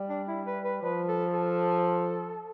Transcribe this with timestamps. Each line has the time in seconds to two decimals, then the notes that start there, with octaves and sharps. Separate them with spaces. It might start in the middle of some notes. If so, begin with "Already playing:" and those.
Already playing: G3
0.09 D4
0.28 E4
0.46 B4
0.65 B4
0.83 F3 B4
1.08 A4
1.33 A4